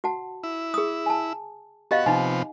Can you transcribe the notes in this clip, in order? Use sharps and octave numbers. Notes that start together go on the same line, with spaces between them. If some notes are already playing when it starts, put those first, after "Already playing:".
F#4 F#5 A5
E4
G#4 D#6
G#5 A5
B3 F#4 G4 D#5 F5
C3 F3 B3 D#4 G#5